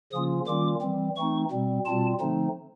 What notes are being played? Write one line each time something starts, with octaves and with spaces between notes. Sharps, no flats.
C#3 F3 A#3 C#4 F4 D#6
D#3 G3 A#3 C#4 F4 D6
E3 G3 C4
E3 A3 C4 D#4 C#6
B2 G3 C4
B2 G3 C4 F4 A5
D3 F3 A3 C4 D#4